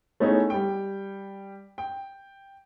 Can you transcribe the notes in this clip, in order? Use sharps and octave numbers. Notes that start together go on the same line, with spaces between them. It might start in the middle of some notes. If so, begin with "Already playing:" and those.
A3 B3 C#4 D#4 E4 G#4
G3 G5
G5